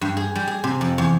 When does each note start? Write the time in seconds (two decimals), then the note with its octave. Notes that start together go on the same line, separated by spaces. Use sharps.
0.01 G2
0.17 G#4
0.35 G3
0.47 G#4
0.64 C3
0.81 F2
0.98 E2